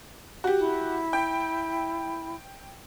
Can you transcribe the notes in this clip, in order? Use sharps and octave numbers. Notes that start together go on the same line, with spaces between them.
F#4 G4
E4
G5